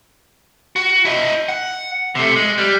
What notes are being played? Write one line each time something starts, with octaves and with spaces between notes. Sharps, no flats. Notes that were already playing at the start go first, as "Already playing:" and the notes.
F#4
E4 D#5
F#5
C3 A3
G#3
G3